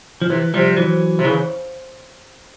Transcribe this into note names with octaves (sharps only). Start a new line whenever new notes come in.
F3
C3 E3
C3 F3 G3
E3 F#3
C3
C#3 E3